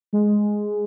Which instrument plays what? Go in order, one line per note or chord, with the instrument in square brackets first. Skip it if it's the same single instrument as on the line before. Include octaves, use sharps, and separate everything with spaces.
[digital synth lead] G#3